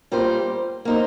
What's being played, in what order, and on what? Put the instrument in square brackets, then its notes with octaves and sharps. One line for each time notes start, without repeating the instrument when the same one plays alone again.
[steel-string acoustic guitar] G3 A#3 F4 C5
A#3 D#4 C5